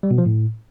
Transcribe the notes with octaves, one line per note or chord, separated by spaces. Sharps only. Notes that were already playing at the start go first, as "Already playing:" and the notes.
G3
B2
F3
A2